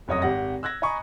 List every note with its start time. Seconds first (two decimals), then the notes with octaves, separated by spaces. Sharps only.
0.08 F1 F#2 C#5 D#5 D#6 A#6
0.22 G#1 G4 F#5 A#6
0.63 E6 F#6 G#6 A#6
0.82 D#5 G#5 A#5 B5 C#6 D#6